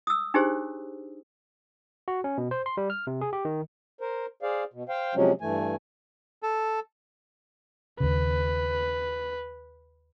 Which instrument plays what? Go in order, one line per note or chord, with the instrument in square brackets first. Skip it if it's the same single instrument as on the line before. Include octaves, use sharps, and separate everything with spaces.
[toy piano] D#6 E6
D4 D#4 G4 G#4 C5 C#5
[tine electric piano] F#4
C#4
B2
C5
C6
G3
F6
C3
G#4
G4
D#3
[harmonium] A#4 C5
G#4 C5 D5 F5
B2
C5 F5 G5
C3 F3 F#3 G#3 C#4
G2 E3 A3 G#5
[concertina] A4
[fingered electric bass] D#2 C#3 [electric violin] B4